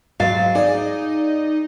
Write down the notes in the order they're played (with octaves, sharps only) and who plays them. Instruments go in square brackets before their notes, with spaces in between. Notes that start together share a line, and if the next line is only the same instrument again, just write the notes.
[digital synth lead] G#2 [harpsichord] F#3 [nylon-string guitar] F5 [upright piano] A6
[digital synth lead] D#4 [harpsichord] G#4 [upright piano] D5